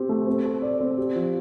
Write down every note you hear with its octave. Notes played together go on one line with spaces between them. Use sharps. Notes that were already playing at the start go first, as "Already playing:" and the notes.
Already playing: C4 G4
A3
C4
A4
D5
C4
G4
F3